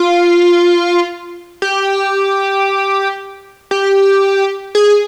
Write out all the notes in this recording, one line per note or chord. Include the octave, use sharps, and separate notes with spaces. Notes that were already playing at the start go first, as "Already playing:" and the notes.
Already playing: F4
G4
G4
G#4